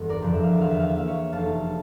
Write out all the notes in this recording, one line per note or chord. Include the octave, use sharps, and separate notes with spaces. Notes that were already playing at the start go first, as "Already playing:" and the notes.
Already playing: G1 E2
A#4 D5
F2 D3 F3
E5
F5
E5
E2 F5
E5
F5
E5
E3 A#3 F5
C#5 E5
F1 F5 A5